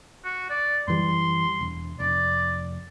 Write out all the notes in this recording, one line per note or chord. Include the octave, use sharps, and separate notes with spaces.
F#4
D5
F#2 E3 G3 C6
E1
F1 D5